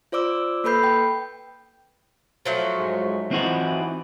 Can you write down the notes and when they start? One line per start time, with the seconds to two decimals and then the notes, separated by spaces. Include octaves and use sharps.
0.12 F4 C5 D5 D6 E6
0.64 A#3 A4 B4 B5 G6 C7
0.84 G5
2.45 F3 F#3 A3
2.77 G#2 G#3
3.31 E3 C4 D#4 F#4